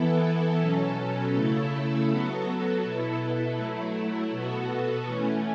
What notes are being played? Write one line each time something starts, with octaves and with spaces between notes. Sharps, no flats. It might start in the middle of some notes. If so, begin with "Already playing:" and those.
Already playing: E3 B3 E4 A4
B2 F#3 C#4 A4
C#3 A3 E4 A4
F#3 B3 F#4 A4
B2 B3 E4 A4
F#3 A3 E4
B2 B3 F#4 A4
E3 A3 C#4